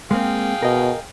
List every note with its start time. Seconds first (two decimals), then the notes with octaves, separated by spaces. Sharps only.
0.11 G#3 A#3 C4 G#4 F5 G5
0.62 B2 A#4 D#5